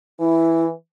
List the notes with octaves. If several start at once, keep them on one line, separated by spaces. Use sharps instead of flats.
E3 E4